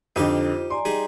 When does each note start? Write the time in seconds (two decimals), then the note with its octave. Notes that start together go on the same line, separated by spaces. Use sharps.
0.16 F2 D3 D#4 F4 G4 C5
0.70 D5 G#5 A#5 C6
0.85 G3 D#4 G#4